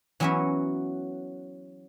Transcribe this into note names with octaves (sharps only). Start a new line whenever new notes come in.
E3 F#3 B3 C#4 A#4 E5